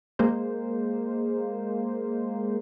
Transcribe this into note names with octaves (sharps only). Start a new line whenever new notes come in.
G#3 A#3 C5